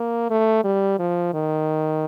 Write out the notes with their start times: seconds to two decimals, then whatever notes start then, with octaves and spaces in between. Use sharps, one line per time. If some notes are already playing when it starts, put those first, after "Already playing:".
Already playing: A#3
0.30 A3
0.64 G3
0.99 F3
1.34 D#3